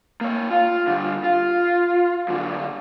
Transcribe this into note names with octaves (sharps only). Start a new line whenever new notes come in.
A#3 C#5
F4
D3 G3
F4
F#2 D3